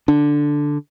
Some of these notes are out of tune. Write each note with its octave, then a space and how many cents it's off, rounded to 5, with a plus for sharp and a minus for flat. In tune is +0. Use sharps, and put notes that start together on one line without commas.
D3 +0 D4 +0